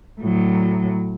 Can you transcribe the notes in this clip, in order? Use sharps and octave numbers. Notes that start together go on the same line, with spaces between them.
A2 F#3